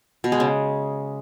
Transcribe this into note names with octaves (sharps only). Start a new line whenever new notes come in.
B2
G#3
C#3